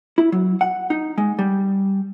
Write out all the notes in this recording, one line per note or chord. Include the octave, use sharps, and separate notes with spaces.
E4
F#3
F#5
D#4
G#3
G3